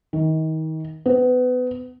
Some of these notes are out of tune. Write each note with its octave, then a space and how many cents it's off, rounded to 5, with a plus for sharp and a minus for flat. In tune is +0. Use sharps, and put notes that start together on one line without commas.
D#3 +30
B3 +25